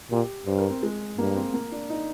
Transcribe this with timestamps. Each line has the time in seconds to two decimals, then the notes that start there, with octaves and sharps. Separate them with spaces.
0.11 A#2 G4
0.46 G2 C5
0.58 A#4
0.70 C4
0.83 G#3
1.18 G2 A#3
1.36 C4
1.54 A#3
1.72 D4
1.90 D#4